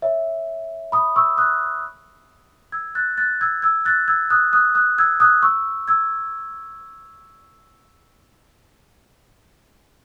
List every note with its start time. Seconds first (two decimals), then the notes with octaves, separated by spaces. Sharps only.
0.02 C#5 E5
0.92 B5 D#6
1.16 C#6 E6
1.37 D#6 F#6
2.72 E6 G#6
2.95 F#6 A6
3.18 F#6 A6
3.41 E6 G#6
3.62 E6 G#6
3.85 F#6 A6
4.08 E6 G#6
4.30 D#6 F#6
4.53 D#6 F#6
4.75 D#6 F#6
4.98 E6 G#6
5.20 D#6 F#6
5.43 C#6 E6
5.88 E6 G#6